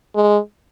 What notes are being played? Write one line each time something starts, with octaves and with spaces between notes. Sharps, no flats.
G#3